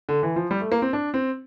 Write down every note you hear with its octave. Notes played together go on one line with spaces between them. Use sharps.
D3
E3
F3
G3
A3
A#3
C4
D4
C4